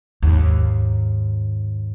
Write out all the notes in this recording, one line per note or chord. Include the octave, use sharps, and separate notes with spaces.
D#2 G#2